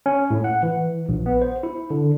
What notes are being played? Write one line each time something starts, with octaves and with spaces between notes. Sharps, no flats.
C#4
A2
F#5
E3
A#1
B3
C5
E4
D3